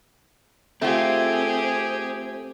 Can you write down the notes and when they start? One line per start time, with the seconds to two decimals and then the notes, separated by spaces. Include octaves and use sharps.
0.82 A3 C4 F4 G4 G#4